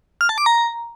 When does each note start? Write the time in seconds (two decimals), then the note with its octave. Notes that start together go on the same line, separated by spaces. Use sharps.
0.21 F6
0.29 A5
0.38 D6
0.46 A#5